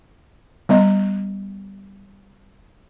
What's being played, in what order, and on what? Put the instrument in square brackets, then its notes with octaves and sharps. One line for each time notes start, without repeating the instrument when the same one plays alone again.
[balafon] G3 B3 D#5